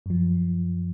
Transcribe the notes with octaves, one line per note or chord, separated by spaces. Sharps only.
F#2 F3